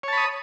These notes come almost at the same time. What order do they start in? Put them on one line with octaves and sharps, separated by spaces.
C#5 A5 B5 D#6